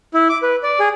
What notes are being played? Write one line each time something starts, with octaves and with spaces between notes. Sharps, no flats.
E4
D6
B4
D5
G#4